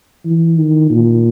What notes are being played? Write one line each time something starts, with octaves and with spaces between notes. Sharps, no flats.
E3
D#3
A#2